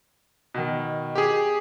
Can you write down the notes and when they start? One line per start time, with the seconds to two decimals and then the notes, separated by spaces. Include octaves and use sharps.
0.54 B2 D#3
1.15 G4 G#4